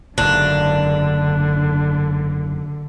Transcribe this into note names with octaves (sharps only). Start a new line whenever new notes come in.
F#1 G#2 D3 D4